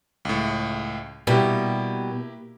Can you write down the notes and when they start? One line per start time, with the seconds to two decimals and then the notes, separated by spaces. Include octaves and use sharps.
0.25 C#2 A2
1.27 B2 G3 A#3 E4 G4